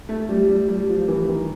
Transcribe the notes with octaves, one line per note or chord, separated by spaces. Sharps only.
A3
G3
G3
G3
F3
E3
D#3